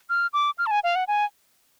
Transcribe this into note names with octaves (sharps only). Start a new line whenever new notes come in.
F6
D6
F6
A5
G#5
F5
F#5
G#5